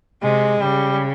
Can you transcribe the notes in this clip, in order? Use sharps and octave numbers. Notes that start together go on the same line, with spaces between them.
C3 G#3
C#3 G3